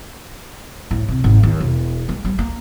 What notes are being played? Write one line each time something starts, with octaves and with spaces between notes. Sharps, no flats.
A2
C3
G#1
D#2
E1
G#3
G3
A#3